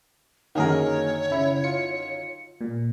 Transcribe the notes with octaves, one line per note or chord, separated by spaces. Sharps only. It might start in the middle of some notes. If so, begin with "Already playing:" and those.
F#2 D3 D#3 A#3 G#4 A#4 C#5
C#3 E4
F4 C#7
A#2